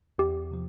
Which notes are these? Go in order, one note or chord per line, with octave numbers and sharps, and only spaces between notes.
E2 G4
C3 F3